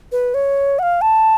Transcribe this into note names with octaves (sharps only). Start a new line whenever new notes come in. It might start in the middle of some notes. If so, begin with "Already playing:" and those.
B4
C#5
F#5
F5
A5